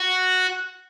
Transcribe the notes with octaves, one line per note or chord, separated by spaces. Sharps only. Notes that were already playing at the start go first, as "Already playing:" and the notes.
Already playing: F#4